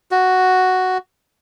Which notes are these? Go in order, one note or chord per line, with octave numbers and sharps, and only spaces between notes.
F#4